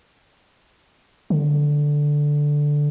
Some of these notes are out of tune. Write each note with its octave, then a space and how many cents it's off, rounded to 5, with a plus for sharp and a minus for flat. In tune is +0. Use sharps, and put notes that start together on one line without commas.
D3 +0